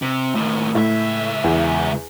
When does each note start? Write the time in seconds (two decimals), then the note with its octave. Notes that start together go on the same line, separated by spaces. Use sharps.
0.02 C3
0.35 D#2 A2
0.75 C#2 A2 E5
1.44 E2